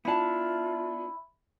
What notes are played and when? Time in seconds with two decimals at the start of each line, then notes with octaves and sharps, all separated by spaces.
0.05 B3 D4 E4 F4 E5 A5 B5 E6